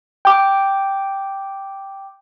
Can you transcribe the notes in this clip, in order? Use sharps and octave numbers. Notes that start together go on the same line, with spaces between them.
G5 D6